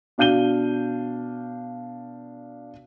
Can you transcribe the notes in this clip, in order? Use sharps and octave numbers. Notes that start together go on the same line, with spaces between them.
B2 D4 F5 G6 D#7 G7